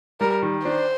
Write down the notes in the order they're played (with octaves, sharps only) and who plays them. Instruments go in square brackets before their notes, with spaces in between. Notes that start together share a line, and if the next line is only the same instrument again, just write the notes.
[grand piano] G3 [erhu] A#4
[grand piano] D#3
[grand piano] D4 [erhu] C5